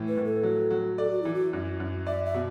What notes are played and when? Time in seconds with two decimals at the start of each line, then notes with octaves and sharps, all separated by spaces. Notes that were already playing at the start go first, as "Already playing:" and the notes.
Already playing: A2 E3
0.08 B4
0.17 A2
0.25 A4
0.43 F#3
0.70 F#3
0.98 A4 D5
1.10 F#4
1.22 E3 E4
1.34 F#4
1.53 F#2
1.80 F#2
2.07 D5 E5
2.25 E5
2.34 B2